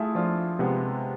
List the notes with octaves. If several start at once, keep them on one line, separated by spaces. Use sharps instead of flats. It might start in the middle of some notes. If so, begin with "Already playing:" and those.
Already playing: A3 E4 F4 G#4 A4
F3 D4 F4
C3 G#3 B3